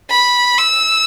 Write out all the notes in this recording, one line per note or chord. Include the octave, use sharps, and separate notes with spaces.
B5
E6